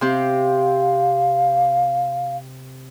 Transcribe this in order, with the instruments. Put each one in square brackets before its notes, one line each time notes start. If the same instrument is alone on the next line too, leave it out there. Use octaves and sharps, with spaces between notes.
[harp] C3 C4 G4 [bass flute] F5